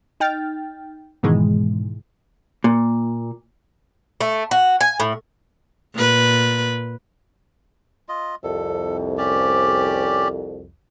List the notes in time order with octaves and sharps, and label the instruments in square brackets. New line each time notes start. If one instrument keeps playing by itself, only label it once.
[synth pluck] D#4 G5 F6 A6
G#2 B2 D#3 E3 G#3
[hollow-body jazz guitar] A#2
[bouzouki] A3
F#4
G#5
A2
[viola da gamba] A#2 B4
[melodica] F4 D#5
[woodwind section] C2 F2 [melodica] A4
[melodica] C#4 G4 D5